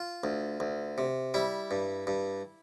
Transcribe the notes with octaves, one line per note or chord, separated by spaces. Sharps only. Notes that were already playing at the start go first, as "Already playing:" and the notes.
Already playing: F4
D2
D2
C3
G3 E4
G2
G2